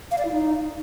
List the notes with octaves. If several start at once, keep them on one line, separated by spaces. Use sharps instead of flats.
F5
D5
E4
D#4